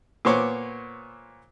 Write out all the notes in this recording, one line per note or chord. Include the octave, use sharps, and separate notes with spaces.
A#2 B3 C5 C#5 D6